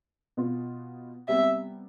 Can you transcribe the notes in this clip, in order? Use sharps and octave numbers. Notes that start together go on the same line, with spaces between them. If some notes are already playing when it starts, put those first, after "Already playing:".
B2 B3 F4
C3 G3 B3 E5